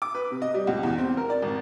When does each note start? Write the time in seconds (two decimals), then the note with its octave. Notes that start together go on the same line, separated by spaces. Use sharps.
0.02 D6
0.15 B4
0.30 C3
0.42 D#5
0.54 G3
0.67 C#2
0.83 E2
0.98 C4
1.17 A#4
1.30 D5
1.42 G#1